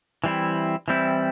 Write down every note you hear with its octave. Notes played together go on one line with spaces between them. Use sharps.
E3 G3 C4 E4
E3 G3 C4 E4